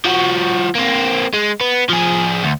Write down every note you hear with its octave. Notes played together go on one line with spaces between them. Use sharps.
F3 F#4
A#3 C4
G#3
B3
F3 G#4
D2